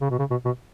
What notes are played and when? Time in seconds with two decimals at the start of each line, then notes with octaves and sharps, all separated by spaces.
0.01 C#3
0.10 B2
0.19 C#3
0.31 B2
0.45 B2